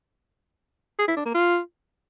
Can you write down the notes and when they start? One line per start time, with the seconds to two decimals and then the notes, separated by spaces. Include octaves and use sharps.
0.99 G#4
1.08 E4
1.17 D4
1.26 A#3
1.34 F4